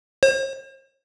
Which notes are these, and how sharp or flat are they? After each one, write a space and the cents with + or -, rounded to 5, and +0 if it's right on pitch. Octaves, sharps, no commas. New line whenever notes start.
C5 +45